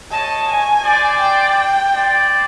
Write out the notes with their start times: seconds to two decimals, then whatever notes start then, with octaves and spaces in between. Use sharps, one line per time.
0.11 C#5 D#5 A5
0.48 G#5
0.83 C5 D5
1.20 G5
1.94 C5 D5